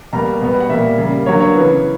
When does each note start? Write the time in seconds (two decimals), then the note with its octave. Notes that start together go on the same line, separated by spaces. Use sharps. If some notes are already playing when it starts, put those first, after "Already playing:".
0.13 B2 G3 A#3 A#5
0.41 B2 G3 B3
0.60 F#5
0.70 A#2 G3 A#3 E5
0.98 C#3 G3 A#3
1.26 D3 F#3 A#3 C#5
1.40 C#5
1.55 C#3 E3 B3